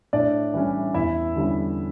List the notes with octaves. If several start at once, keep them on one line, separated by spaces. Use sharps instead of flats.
A2 D4 D5
E3 G3 C#4
E2 E4 E5
D3 G3 C#4 E4